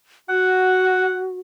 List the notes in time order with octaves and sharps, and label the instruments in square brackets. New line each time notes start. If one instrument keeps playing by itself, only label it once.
[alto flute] F#4 [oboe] F#5